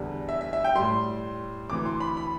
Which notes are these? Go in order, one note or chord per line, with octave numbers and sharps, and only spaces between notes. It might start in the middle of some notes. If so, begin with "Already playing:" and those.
Already playing: E2 D3 G3
E5
E5
E5
G5
A2 G3 C6
D2 C3 E3 D6
C6
B5
B5